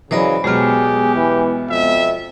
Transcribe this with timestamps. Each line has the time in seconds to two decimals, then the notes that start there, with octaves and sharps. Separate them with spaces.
0.11 C#3 E3 F#3 C5 D5 D#5 B5
0.44 B2 F#3 G#3 B3 G4 G#4 F6
1.15 E3
1.69 F2 E5